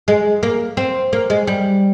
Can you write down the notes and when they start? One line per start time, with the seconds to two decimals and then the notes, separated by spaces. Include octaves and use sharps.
0.08 G#3
0.43 A#3
0.77 C4
1.13 A#3
1.30 G#3
1.47 G3